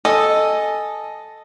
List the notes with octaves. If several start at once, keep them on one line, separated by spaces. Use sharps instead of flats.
A4 D#5 G#5